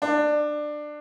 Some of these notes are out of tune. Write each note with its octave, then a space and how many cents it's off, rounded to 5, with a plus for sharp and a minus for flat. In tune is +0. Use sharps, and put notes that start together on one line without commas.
D4 +20